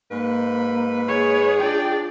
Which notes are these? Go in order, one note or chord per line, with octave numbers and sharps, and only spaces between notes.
G#2 A#3 B4 B5
G#4 C#5
D4 F4 D5 G5